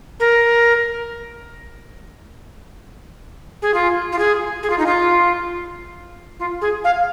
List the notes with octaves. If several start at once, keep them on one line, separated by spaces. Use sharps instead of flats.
A#4
G#4
F4
F4
G#4
G#4
F4
D#4
F4
F4
G#4
F5